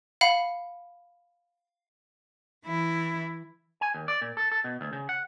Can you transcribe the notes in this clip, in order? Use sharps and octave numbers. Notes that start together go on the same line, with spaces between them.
F5 F#5 B5
E3 E4
G#5
D#2
D5
A#2
A4
A4
B2
D2
C#3
F#5